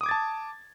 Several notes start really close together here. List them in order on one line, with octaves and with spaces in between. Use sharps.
D#6 D6 G#6 A6 A5